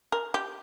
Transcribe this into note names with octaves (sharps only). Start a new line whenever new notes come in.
A#4
G4